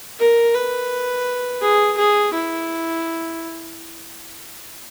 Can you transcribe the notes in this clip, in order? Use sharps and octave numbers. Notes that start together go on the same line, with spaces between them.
A#4
B4
G#4
G#4
E4